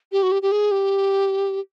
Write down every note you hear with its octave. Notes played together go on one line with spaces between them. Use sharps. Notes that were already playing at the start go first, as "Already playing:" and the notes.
G4
F#4
G4
G4
G#4
G4